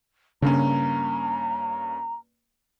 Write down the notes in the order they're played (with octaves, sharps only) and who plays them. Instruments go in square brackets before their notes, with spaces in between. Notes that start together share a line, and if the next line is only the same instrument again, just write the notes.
[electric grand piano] G2 A#3 C#4 [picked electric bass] C#3 D4 [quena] A#5